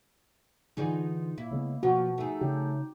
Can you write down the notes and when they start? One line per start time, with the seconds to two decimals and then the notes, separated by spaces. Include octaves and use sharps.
0.77 D3 E3 D#4 F4 G#4 D5
1.38 A#2 A#3 E4
1.51 C#3 G#3 B3
1.83 B2 F3 F#4
2.18 A3 D#4 G#4
2.41 C#3 G4